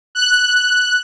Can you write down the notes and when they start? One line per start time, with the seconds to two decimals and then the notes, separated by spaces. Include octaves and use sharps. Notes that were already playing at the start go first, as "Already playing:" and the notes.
0.15 F#6